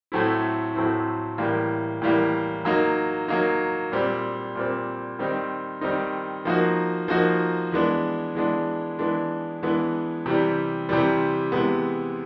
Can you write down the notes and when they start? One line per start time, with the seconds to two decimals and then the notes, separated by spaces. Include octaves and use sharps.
0.12 A2 F#3 A3 C4 E4
0.75 A2 F#3 A3 C4 E4
1.38 A2 E3 G3 A#3
2.02 A2 E3 G3 A#3
2.65 F#3 A#3 D#4
3.28 F#3 A#3 D#4
3.92 A#2 G3 C4
4.55 A#2 G3 C4
5.19 D#3 G3 C4 D#4
5.81 D#3 G3 C4 D#4
6.45 F3 A#3 D#4 F#4
7.08 F3 A#3 D#4 F#4
7.72 E3 G#3 B3 D4
8.35 E3 G#3 B3 D4
8.99 E3 G#3 B3 D4
9.63 E3 G#3 B3 D4
10.26 C3 E3 G3
10.89 C3 E3 G3
11.52 C3 E3 G#3 B3